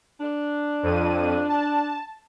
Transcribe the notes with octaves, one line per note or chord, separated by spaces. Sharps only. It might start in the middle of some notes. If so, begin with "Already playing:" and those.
D4
F2 D#7
A5